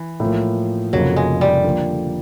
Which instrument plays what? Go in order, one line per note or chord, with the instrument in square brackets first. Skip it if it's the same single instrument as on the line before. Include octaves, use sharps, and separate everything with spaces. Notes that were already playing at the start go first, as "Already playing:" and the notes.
Already playing: [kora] E3
[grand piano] A2 F3 A#3
[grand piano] F1 F2 C#3 F3 A#3 [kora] F#3
[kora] G#3
G3
[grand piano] D3 F3 A#3